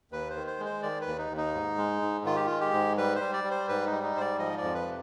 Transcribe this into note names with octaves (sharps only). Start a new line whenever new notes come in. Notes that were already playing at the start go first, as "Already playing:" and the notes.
D#2 B4
C5
D#3
C5
G#3
C5
D#3 D5
B4
D#2
D#4
D#2
D#4
G#2
G#3
G#2
D#3 F4
G4
G#3 F4
G4
G#2
G3 B4
G3 C5
D5
G3
C5
G#2 B4
G3 D#4
D#4
G#2 C5
D5
F3 D#5
D5
F2
B4
C3